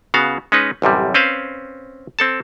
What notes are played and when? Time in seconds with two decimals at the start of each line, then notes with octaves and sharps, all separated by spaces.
0.14 C#3 B3 F#4 F5
0.52 G#3 C#4 D#4 B4
0.82 A1 F#2 C3 G3
1.14 C4 C#4 B4 C5 F5
2.19 C4 A4 A5